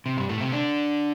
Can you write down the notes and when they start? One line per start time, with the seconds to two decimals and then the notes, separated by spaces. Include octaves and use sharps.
0.06 C3
0.17 G2 G3
0.29 A2 A3
0.40 C3 C4
0.52 D3 D4